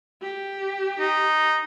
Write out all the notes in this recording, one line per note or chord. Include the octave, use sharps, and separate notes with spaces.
G4
D#4